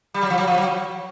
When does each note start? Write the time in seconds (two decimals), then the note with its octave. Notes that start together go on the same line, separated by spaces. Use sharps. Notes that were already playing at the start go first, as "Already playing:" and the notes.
0.14 G3
0.23 F#3
0.30 F3
0.38 F#3
0.47 F3
0.58 F#3